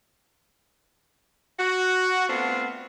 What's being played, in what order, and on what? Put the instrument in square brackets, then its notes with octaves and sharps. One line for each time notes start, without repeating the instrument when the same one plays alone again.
[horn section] F#4
A3 B3 C4 D4 F4